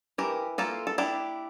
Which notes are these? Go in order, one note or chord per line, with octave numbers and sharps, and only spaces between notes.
E3 G4 A#4
A#3 F4 A4
A4
D4 E4 G4